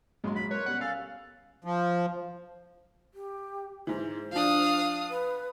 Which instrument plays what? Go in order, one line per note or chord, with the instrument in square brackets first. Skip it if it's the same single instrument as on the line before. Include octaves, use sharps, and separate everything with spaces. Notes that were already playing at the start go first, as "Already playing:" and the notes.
[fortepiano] A#1 F#3 C6 [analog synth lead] G#3
[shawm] B5
[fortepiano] A#4 [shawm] B4 [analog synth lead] C#5
[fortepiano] B2 G3 C#4 [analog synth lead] F#5
[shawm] A4 [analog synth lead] F5 [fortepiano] G#5
[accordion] F3
[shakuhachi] G4
[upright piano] G#2 E3 [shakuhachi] C5
[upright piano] F3 D4 [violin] F5 D#6
[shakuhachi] B4